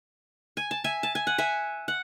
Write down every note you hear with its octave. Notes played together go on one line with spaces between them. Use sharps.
G#5
A5
E5 G#5
A5
G#5
F#5
E5 G#5
F#5